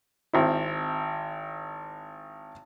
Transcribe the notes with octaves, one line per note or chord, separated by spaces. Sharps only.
G#1 C4 E4